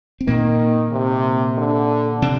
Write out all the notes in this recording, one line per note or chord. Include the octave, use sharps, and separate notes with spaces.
C4
A#2 D#3 A#3
C3
D3
C3 C4